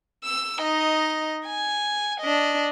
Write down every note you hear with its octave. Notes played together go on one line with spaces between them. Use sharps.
E6
D#4 D#5
G#5
D4 D#5